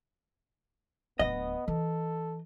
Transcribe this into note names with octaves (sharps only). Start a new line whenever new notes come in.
D1 B3 D4 D#5
E3 A4